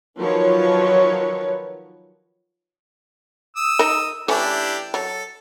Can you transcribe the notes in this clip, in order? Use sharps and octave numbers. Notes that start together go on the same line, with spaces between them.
D#3 F3 F#3 B4 C#5
D#6 E6
D#4 A#4
E3 A3 C#4 D4 E4 G4
F#3 A4